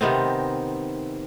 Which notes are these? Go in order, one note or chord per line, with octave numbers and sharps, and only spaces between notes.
C3 D#3 B3 C4